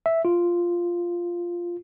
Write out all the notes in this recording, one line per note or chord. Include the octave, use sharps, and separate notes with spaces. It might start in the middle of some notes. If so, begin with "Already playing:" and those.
E5
F4